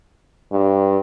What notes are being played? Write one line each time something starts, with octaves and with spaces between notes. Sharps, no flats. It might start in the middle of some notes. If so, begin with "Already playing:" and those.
G2